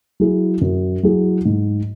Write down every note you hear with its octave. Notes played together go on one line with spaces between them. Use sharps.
F#3 E4 G#4
F#2
F#3 E4 G#4
G#2